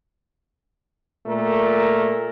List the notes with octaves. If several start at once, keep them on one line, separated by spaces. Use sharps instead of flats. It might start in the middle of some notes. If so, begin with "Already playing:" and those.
A#2 A3 A#4